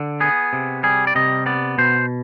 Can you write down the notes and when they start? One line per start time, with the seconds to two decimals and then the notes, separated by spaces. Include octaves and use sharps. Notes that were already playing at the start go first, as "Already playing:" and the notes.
Already playing: D3
0.20 B3 G#4
0.53 C3
0.83 G3 G#4
1.07 D5
1.15 C3 D#5
1.46 B3 D5
1.78 B2 C5